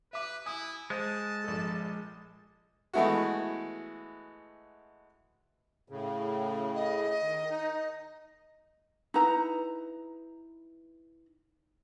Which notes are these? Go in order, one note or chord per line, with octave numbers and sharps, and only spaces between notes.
B4 E5 D6
E4 G#5 D#6
G#3 C5 A5
A#1 A4
E3 G#3 A3 B3 E4 F#4
A2 C#3
D#5
D#3
D#4
D#4 E4 B4 A#5